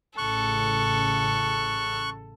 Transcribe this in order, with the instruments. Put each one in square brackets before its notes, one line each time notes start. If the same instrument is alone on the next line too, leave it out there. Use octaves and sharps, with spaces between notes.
[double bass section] A1 A2 C#3 [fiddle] A4 [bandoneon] C#6 F#6